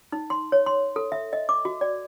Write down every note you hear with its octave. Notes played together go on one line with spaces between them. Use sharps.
D#4
C6
C#5
C6
A4
E5
D#5
D6
F#4
D5